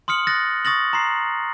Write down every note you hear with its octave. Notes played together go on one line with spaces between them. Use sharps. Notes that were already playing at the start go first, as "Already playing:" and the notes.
C6 D#6 F6 C#7 F#7
D#6 F#6 A6 A#6
C#6 D#6 A6 A#6 F#7
A#5 C6 C7